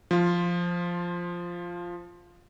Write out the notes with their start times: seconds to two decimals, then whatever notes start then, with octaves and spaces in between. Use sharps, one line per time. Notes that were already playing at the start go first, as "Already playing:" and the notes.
0.11 F3 F4